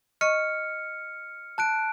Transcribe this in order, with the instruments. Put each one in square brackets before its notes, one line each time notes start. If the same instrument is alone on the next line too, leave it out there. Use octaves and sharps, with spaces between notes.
[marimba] D#5 C#6 [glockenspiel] F6 C#7
[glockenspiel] A5 F#6 D7